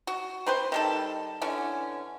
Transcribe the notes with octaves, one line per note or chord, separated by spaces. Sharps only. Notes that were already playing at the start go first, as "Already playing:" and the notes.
F#4
C4 B4 C5
D#3 G3 A4
D3 E3 C#4